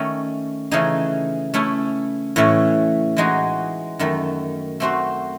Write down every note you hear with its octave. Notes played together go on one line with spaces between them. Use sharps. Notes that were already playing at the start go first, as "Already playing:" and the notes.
Already playing: D#3 A3 C#4
C#3 E3 A3 D#4 G#4
A3 C#4 E4
A2 E3 A3 C#4
E3 G#3 D#4 F#4
F#2 D#3 A3
A3 C4 F#4 C5